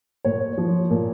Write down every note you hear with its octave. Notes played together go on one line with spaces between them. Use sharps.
A#2 C#5
F3
A#2